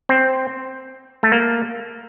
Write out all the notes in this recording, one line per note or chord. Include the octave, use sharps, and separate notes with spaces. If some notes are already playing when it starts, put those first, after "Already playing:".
C4
A3
A#3